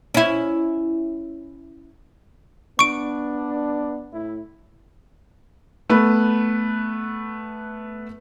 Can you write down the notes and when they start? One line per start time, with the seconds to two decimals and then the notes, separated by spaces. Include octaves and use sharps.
0.14 C#4 E4
2.79 B3 D4 C#6 D7
4.13 A2 E4
5.90 A3 B3 B4